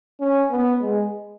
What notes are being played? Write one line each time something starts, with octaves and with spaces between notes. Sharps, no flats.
C#4
B3
G#3